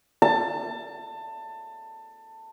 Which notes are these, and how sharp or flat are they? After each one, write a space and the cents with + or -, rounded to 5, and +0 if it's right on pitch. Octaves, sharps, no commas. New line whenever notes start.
A5 +20